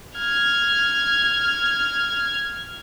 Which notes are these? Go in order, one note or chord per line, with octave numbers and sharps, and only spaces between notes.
F6 G#6